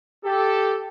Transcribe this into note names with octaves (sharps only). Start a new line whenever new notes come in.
G4 A4